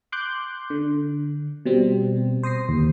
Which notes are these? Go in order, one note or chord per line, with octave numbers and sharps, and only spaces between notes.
C6 D6 F#6 G6
D3
B2 G3 C4
C5 D#6 A#6 C7
D#2